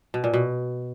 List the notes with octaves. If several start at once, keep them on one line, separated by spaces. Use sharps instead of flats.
B2
A#2
B2